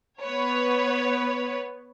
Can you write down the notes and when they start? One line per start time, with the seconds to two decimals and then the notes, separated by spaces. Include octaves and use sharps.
0.22 B3 B4 C#5